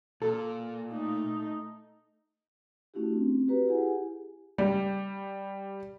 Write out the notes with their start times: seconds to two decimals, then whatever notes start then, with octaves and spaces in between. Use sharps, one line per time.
0.22 A#2 A4
0.92 A3 D#4
2.94 A3 C#4 D4 E4 F#4 G4
3.13 C4
3.48 F#4 G4 B4 A#5
3.68 E4 G4 G#4 F#5 G#5
4.58 G3